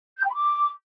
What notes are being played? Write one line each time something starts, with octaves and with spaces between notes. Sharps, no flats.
G6
G5
B5
D6